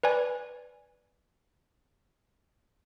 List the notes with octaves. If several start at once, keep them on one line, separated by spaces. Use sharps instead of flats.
B4 D5 G#5